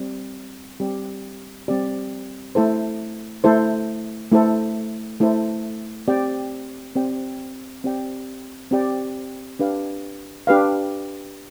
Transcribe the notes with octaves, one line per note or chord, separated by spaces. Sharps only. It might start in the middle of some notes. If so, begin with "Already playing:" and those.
Already playing: G3 C4 G4 D5
G3 C4 G4 D5
G3 C4 G4 D5
A3 E4 A4 C5
A3 E4 A4 C5
A3 E4 A4 C5
A3 E4 A4 C5
C4 G4 D5 G5
C4 G4 D5 G5
C4 G4 D5 G5
C4 G4 D5 G5
D4 G4 B4 F5
D4 G4 B4 F5